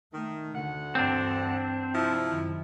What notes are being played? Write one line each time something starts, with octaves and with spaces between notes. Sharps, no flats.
D#3 A3
D2 D3 F#5
G2 E3 C4 D4
C3 F3 E4
F#2 D#3